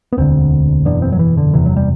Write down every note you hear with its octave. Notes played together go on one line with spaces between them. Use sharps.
B3
E1 D2 D3 C4
F#1 E2 B2 D4
C4
F#3
E3
D3
F#1 E2 C3 E3
F#3
G3